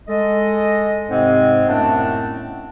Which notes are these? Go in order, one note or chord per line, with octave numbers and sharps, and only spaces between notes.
G#3 A4 D#5
G#2 C3 G#3 C4
F#2 A2 A3 B3 C4 D4